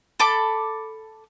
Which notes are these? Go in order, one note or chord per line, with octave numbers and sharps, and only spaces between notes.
A4 B5 D6